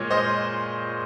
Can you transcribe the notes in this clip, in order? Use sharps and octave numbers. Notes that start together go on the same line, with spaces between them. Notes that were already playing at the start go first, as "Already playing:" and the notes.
Already playing: A#2 G#3 A#4 C#5
C5 D#5